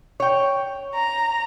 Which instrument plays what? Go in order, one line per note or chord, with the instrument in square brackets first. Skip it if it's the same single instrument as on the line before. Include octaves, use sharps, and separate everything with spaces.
[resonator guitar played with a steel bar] C#5 G5
[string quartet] A#5